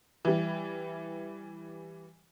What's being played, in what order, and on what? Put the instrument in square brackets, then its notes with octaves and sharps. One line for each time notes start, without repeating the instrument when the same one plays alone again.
[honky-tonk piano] E3 G3